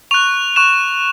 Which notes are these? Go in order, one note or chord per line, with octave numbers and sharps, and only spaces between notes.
C#6 F#6 F7
C#6 F#6 E7